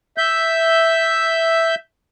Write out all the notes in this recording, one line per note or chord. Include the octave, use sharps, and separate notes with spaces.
E5 G6